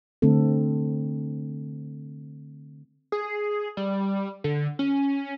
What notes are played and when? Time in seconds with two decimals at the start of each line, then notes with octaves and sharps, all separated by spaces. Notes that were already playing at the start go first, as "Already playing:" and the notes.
0.22 D3 A3 C4 A4
3.12 G#4
3.77 G3
4.44 D3
4.79 C#4